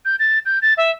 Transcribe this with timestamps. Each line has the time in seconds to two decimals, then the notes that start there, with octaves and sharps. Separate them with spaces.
0.05 G6
0.20 A6
0.46 G6
0.62 A6
0.77 E5